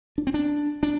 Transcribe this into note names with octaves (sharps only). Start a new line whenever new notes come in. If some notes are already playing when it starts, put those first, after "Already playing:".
D4
C4
D4
D4